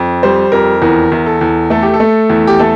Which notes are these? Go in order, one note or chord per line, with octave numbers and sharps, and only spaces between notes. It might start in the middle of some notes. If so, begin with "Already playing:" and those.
Already playing: F2
G3 C5
F2 A#4
E2 A#4
E2
A4
E2
A3 A4
G4
A4
A3
E2
G4
A3 A4